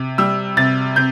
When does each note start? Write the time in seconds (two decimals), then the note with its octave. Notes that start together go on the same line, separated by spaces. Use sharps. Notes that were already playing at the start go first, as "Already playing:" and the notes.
Already playing: C3
0.18 G3 E6
0.57 C3 A6
0.96 C3 G6